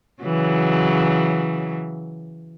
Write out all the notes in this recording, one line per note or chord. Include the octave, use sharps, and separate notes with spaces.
C#3 E3 F#3